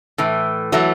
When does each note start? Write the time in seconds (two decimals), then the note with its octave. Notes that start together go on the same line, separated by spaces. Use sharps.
0.18 A2 E3
0.72 E3 F#3 A3